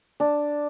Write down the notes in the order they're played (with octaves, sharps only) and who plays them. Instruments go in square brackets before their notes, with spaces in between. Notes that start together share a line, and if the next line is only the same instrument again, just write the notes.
[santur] D4